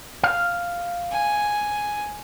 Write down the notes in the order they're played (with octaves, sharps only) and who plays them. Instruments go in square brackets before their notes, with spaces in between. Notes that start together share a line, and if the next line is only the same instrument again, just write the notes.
[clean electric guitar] F5
[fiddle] G#5